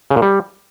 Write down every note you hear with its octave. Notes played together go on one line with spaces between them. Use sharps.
C#3
A#2
G3